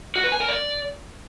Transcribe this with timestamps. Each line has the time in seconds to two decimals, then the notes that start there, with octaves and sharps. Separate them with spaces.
0.16 F#4
0.24 B4
0.32 G#5
0.40 A#4
0.48 D5